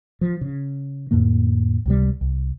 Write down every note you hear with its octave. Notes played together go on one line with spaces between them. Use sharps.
F3
C#3
F2 A2 D3 A#3
C#2 C3 G3
C2